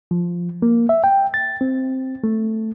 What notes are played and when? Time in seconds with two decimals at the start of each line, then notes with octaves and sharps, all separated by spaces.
0.11 F3
0.62 A#3
0.89 E5
1.04 G5
1.34 A6
1.61 C4
2.24 A3